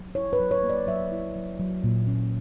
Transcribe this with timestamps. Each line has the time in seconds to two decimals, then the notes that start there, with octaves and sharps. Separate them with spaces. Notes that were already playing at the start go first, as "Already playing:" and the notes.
Already playing: F#3
0.15 E4 C#5
0.33 B4
0.40 F#3
0.51 C#5
0.63 A#3
0.70 D5
0.87 F#3 E5
1.12 E4
1.36 F#3
1.60 F#3
1.84 A#2
2.07 C#4